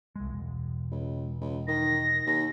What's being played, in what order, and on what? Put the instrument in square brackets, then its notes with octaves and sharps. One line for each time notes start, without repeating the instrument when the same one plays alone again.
[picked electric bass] C2 G#3
E1
[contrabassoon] C#2
C#2
[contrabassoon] D#3 [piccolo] A#6
[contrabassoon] D#2